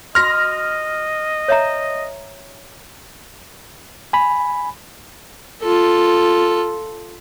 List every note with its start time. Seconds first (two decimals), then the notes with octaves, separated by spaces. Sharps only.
0.15 F#4 D#5 C6 F6 A#6
1.48 C#5 E5 A#5
4.13 G#5 B5
5.62 F4 A4